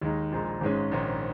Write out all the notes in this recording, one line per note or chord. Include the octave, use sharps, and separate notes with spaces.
D#2 D#3 G#3 D#4
A#1 A#2 G#3 D#4
G#1 G#2 G#3 C#4
A#1 G#2 D#3 C#4